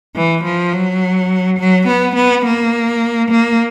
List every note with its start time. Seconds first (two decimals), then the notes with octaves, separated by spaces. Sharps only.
0.16 E3
0.44 F3
0.73 F#3
1.59 F#3
1.88 B3
2.16 B3
2.45 A#3
3.31 A#3